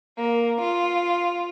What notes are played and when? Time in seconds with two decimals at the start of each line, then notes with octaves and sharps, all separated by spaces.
0.19 A#3
0.62 F4